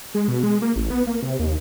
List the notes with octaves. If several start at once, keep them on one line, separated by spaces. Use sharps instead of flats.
G#3
B2
G#3
A#3
A1
B3
A#3
C3
D#2